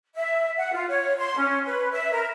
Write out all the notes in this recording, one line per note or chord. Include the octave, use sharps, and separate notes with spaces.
E5
F#5
F4
C#5
C6
C#4
B4
E5
A#4